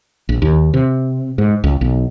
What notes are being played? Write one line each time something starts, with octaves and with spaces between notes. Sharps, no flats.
A#1
D#2
C3
G#2
C#2
B1